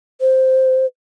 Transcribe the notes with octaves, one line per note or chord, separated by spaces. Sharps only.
C5